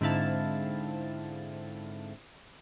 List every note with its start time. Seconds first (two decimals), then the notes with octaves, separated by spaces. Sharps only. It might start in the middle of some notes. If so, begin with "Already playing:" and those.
0.01 G#2 D3 C4 E4 F5 A5